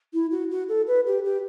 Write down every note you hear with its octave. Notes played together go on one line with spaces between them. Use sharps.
E4
F#4
F#4
A4
B4
G4
G4